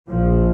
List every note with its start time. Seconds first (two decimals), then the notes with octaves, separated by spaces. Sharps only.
0.09 A#1 A#2 F3